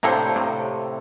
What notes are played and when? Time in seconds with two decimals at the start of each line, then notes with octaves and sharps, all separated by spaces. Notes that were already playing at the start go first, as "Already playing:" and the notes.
0.03 A2 C3 A#3 D4 A4 C5
0.36 A2 C3